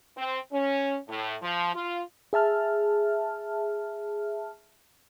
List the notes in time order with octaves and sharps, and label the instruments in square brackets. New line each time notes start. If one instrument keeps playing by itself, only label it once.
[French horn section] C4
C#4
A2
F3
F4
[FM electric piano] G#4 E5 A5 F6